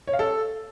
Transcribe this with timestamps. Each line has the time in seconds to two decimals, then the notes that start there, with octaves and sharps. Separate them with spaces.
0.07 C#5
0.13 F5
0.19 A4